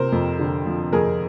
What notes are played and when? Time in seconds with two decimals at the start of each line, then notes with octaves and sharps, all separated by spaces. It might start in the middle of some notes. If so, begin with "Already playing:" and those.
Already playing: C3 A#4 C5
0.12 F2
0.39 D3
0.66 F3
0.93 F2 G#4 A#4